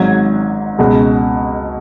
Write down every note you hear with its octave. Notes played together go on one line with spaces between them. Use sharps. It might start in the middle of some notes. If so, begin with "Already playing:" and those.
Already playing: G#1 G#2 F#3 G#6
C#2 B2 G#3